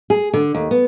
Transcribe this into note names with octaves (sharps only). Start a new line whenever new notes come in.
G#4
D3
D#2
B3